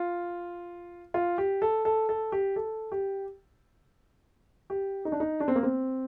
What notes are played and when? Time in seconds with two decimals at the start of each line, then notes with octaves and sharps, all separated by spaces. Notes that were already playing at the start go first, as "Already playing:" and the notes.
Already playing: F4
1.14 F4
1.38 G4
1.62 A4
1.85 A4
2.09 A4
2.32 G4
2.56 A4
2.92 G4
4.70 G4
5.05 D#4
5.12 D4
5.20 D#4
5.40 D4
5.48 C4
5.55 A#3
5.63 C4